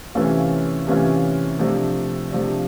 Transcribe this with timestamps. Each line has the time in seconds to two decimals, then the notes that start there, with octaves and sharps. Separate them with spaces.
0.15 C3 E3 A3 C#4 F4
0.87 C3 E3 A3 C#4 F4
1.59 C3 F3 A3 D4
2.32 C3 F3 A3 D4